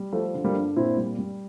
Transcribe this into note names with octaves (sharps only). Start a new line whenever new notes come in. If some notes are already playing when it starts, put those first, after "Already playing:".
Already playing: G3
F3 A3
D3
G3 A#3
G2
A#2 C4 E4
G3
G3